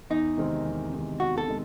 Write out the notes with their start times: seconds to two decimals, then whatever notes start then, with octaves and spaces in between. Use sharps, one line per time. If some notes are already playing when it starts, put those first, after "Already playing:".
0.10 E2 D#4
0.37 C3 D#3 G#3 C4
0.65 E2
0.92 C3 D#3 G#3 C4
1.20 E2 F#4
1.38 A4
1.47 C3 D#3 G#3